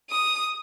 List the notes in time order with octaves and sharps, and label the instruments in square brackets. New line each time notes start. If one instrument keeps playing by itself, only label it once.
[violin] D#6